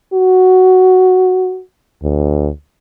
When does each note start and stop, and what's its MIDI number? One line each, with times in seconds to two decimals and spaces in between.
0.13 1.61 66
2.03 2.49 38